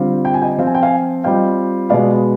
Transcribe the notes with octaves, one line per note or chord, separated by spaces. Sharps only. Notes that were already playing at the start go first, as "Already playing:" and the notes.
Already playing: D3 G3 C4 F4
G5
G#5
D#5 G5
F3 C4 F4
G#5
G5
F5 G#5
G3 C4 F4 D#5 G5
B2 G#3 B3 D5 F5